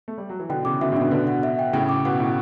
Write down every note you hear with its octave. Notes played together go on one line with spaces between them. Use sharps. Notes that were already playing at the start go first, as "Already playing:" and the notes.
A3
G3
F#3
E3
B2 D3 G5
C#3 E3 D6
B2 D3 E5
A2 C#3
B2 D3 D4
B2 D3 B4
F#5
E5
G5
A2 C#3 G5
D6
B2 F#5
A2 E4